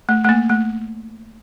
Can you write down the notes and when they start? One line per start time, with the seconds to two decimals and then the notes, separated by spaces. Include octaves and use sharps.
0.09 A3
0.24 A3
0.29 A#3
0.49 A3